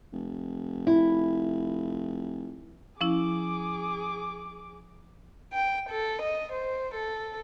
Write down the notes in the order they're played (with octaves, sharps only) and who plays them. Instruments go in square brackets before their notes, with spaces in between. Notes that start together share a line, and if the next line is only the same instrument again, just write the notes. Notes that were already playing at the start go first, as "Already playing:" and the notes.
[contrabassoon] F1
[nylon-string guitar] E4
[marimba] F3 C#4 E4 [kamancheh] G#4 D6
[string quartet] G5
A4
D#5
C5
A4